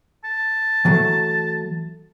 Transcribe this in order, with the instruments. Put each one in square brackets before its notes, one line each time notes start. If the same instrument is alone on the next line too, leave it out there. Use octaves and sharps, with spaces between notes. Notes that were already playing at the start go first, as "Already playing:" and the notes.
[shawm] A5
[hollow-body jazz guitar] E3 F#3 A3